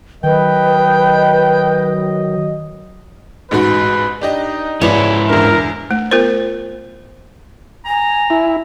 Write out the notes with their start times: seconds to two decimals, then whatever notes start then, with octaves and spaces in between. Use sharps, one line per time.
0.24 D#3 F#3 B4 D#5 G5
3.51 A1 G#2 F#4 B4
4.22 D4 D#4 G4 D#5
4.81 G#2 G#3 C#4 E4 B4 D5
5.29 E2 D3 A#4
5.91 A3
6.11 B3 F4 A#4 C5
7.86 G#5 A#5
8.30 E4